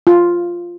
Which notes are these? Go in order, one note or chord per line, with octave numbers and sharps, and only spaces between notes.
F4